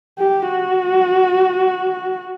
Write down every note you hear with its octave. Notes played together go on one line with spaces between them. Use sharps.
G4
F#4